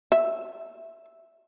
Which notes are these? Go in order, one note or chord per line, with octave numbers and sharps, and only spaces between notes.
E5